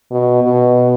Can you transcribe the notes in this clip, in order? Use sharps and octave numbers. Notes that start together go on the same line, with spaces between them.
B2
B2